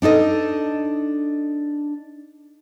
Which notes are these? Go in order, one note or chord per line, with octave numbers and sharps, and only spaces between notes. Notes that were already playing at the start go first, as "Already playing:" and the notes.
D4 D#4 A4 D#5